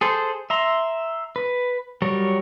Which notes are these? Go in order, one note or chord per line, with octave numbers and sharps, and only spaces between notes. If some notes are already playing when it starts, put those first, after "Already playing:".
G#4 A4 C5
E5 A#5 C6
B4
F#3 G3 A#4 C#5